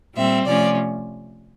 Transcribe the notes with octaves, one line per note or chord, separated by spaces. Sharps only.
A#2 G3 C4 E5
C3 F3 A3 C#4 D5